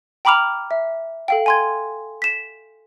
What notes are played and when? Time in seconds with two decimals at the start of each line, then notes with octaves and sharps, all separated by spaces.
0.25 G5 A#5 B5 D6 F6 F7
0.71 E5
1.28 A4 F5 G5
1.46 G#5 C6 G#6
2.22 B6 E7